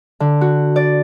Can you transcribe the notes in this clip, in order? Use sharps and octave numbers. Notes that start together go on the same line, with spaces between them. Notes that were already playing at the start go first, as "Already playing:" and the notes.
D3
F#4
D5